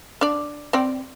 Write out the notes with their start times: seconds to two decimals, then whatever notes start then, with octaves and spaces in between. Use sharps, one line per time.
0.21 D4 D5
0.73 C4 D5 G5